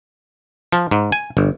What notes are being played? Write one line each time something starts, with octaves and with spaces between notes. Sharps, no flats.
F3
G#2
G#5
G1